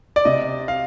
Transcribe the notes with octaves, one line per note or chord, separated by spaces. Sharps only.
D5
C3 D#5
F5